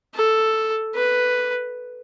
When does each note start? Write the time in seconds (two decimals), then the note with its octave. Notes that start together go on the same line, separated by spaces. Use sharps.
0.14 A4
0.95 B4